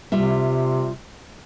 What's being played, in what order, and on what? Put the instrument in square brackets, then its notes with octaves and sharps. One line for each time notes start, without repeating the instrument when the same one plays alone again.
[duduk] C3 [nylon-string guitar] G3 F4 E5